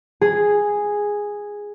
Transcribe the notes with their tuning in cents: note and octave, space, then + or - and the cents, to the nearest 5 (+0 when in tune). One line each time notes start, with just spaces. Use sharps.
G#4 -5